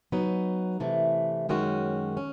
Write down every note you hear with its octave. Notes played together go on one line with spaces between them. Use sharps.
F#3 B3 D#4
C3 E3 A3
F#2 D#3 G#3 C#4 F#4
C#4